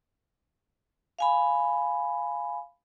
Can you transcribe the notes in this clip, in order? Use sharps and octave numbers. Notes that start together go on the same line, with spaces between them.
F5 G#5 B5